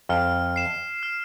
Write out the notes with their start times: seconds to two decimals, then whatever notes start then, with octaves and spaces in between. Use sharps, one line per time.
0.09 F2 F6
0.56 C7 E7
1.03 F6